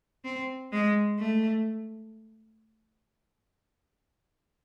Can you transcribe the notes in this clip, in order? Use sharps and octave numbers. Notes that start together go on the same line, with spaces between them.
C4
G#3
A3